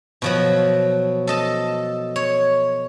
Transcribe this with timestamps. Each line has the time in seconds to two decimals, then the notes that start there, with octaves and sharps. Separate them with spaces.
0.22 B2 F3 F#3
1.27 A4 D#5 A5
2.16 C#5